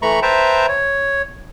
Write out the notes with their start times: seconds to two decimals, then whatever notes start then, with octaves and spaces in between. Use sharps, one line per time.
0.02 E3 A3 A#5 B5 C#6
0.22 B4 C5 E5 G5 A5 A#5
0.69 C#5